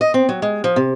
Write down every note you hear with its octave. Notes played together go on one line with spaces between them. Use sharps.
D#5
C4
F#3
G#3
F3
C3